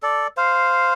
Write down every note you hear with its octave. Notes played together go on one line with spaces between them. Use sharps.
A4 D5
C5 F5